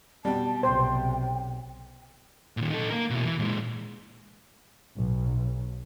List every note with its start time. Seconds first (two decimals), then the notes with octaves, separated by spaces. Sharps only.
0.25 B2 G3 A5
0.63 B1 C3 C5 G5
2.57 A#2 D#3
2.70 D#4 A4
2.90 A#3 A#4
3.10 B2 E4
3.25 E3
3.39 A#2 G#3
4.97 B1